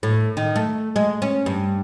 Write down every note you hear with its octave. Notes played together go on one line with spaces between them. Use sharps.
A2
D#3
A3
G#3
C#4
G2